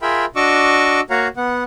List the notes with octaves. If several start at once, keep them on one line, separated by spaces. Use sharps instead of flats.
F4 G#4 A#4 E5 G5 B5
D4 F#4 D#5 C#6 D6 E6
A#3 F#4 C#5 F5 F#5 A#5
B3 F#5